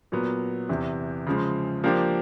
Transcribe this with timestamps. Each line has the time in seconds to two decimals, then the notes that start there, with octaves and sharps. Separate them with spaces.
0.12 A#2 F#3 B3
0.69 E2 C3 E3
1.27 C#3 F3 G#3
1.84 F3 A#3 D4 G4